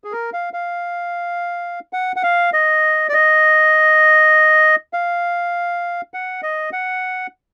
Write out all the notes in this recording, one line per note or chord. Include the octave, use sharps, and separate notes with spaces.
G#4
A#4
F5
F5
F#5
F#5
F5
D#5
D5
D#5
F5
F#5
D#5
F#5